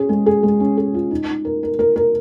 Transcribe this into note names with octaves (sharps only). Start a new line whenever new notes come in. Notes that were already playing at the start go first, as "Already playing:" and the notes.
Already playing: C#4 G#4
G#3
G#4
G#3
C#4
G#4
F4
D#4
D#4
A#4
A#4
A#4
A#4